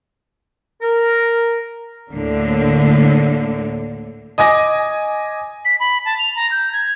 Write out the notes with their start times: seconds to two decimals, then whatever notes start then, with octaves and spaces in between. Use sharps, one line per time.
0.82 A#4
2.13 D2 A2 D3 A#3
4.38 D#5 G#5 D6 A#6
5.65 B6
5.80 B5
6.05 A5
6.19 F7
6.36 A#5
6.51 G6
6.73 G#6